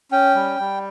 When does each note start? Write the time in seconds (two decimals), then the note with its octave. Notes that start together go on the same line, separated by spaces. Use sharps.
0.11 C#4 G5
0.35 G3
0.59 G3